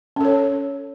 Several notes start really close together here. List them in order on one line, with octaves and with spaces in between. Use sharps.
C#4 A4 C#5